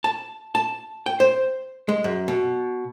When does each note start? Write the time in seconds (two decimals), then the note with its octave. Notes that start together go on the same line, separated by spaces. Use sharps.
0.04 A5
0.55 A5
1.06 G5
1.20 C5
1.89 G#3
2.04 F#2
2.28 B2